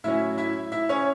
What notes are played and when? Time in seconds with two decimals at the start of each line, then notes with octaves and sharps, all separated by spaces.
0.04 A2 F#3 C#4 E4 E5
0.38 E4 E5
0.72 E4 E5
0.89 C#4 C#5